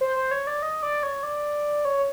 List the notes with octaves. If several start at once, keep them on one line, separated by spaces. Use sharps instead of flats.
C5
C5
C#5
D5
D#5
D5
C#5
D5
C#5